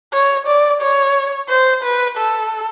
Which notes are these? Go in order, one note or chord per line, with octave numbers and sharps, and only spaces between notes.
C#5
D5
C#5
C5
B4
A4